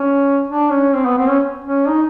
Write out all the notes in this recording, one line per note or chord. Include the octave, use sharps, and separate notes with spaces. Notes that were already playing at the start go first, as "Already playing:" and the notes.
Already playing: C#4
D4
C#4
C4
B3
C4
C#4
C#4
D#4